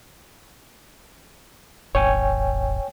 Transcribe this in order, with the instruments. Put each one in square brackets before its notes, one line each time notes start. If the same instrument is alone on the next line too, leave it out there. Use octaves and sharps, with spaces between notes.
[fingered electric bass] D#1 G#1 [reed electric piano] C#5 G5 G#5